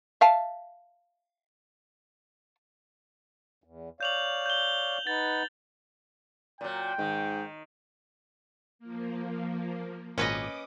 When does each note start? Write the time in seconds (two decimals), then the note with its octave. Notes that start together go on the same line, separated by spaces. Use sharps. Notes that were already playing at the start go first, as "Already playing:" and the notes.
0.21 E5 F5 A5
3.64 E2
4.00 C#5 D5 F5 G6 F7 F#7
4.46 G6 G7
5.07 D#4 B4 F#5 A6
6.61 A#2 F#3 G5
6.99 G#2 D#3
8.79 F3 A#3
10.18 G#1 A#2 C#4 B4 D#5 D6 D#6